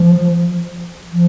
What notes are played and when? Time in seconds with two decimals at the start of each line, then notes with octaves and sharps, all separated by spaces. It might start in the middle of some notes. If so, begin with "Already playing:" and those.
Already playing: F3
1.13 F3